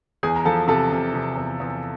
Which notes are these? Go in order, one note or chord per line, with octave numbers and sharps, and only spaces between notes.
E2 G#4 G#5
A#5
F3 A4 A5
C3 A4 A5
C3
C3
E2
E2